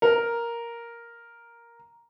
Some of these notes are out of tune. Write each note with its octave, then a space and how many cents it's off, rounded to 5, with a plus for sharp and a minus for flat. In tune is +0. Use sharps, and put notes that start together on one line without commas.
A#4 +5